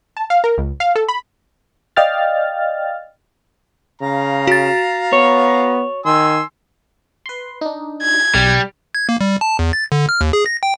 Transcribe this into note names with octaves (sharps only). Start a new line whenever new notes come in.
A5
F5
A#4
C#2
F5
A4
B5
D5 D#5 F5 G5 F6 A6
C#3 F5 A#5
F#4 A6
B3 C#5
D#3 G#5 C6 E6
B4 C6
D4 D#4
G#6
B1 G3
G#6
A#3
G3
A5
E2
A6
D3
F6
D#2
G#4
A#6
G5